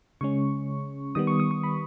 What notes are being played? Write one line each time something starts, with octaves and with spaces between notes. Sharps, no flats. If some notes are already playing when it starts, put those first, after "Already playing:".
C#3 G#3 C#4 C#6
D#3 G3 B3 D#6
C#6
D#6
C#6
B5